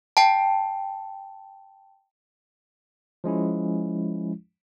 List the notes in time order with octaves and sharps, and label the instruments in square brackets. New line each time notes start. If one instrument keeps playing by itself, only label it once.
[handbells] G5 A5
[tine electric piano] F3 G#3 C#4 E4